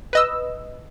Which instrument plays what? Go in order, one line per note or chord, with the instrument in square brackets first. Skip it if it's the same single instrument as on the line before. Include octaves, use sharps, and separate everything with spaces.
[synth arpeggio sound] B4 D#5 E6